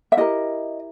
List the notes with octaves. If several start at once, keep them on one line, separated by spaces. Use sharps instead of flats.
E5
E4 G4 A#4 D#5